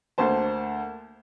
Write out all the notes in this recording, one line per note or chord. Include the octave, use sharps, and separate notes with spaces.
D2 A#3 C5 A5